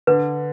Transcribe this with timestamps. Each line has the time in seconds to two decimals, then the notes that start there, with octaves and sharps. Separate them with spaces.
0.07 D3 B4